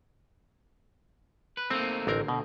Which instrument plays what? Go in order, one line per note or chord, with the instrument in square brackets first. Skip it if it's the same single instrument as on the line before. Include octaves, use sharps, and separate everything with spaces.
[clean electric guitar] B4
[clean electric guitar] A3 A#3 D#4 [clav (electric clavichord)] C4
[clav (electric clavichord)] A1 C4 A#4 [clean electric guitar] D2
[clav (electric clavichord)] B2